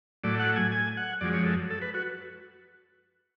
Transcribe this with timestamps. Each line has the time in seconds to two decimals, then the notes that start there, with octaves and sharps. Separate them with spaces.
0.24 A2 F#3 A3 D5
0.40 F#5
0.56 G#5
0.72 G#5
0.97 F#5
1.21 F#2 F3 G#3 D5
1.33 C#5
1.45 A4
1.70 A4
1.82 B4
1.94 F#4